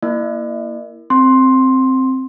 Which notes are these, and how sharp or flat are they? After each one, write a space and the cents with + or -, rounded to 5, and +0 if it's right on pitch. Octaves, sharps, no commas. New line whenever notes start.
A#3 +0 E4 +0 D5 +45
C4 +0 C6 +10